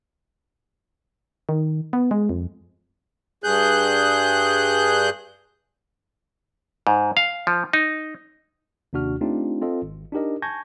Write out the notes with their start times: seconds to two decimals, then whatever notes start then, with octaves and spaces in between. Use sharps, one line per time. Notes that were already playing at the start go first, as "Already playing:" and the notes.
1.49 D#3
1.93 B3
2.11 G#3
2.29 F2
3.44 G2 G#4 F#6 G6
6.87 G#2
7.17 F5
7.47 F3
7.73 D#4
8.93 D#2 C3 D4 F#4 F6
9.21 A3 C4 D4 D#4 F4 G4
9.62 C4 F4 A4 D#5
9.82 G#1
10.12 D4 D#4 G4 A#4 D#5
10.42 G#5 A5 C#6 G6 G#6 A#6